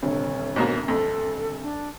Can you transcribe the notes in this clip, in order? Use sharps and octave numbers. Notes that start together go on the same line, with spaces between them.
D#1 D2 C3 C#5
G#2 B2 A#3
F2 A4
D4